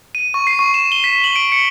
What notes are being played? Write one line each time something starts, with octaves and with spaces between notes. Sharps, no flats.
D#7
C#6
C7
C#6
E7
G7
B6
F#7
D7
C#7